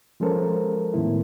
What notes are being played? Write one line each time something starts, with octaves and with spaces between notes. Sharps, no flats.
F3 G#3 C#4 A4 A#4 C5
A2 D#3 B3 E4